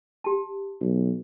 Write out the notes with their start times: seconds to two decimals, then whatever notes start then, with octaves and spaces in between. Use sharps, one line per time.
0.24 G4 A5
0.81 B1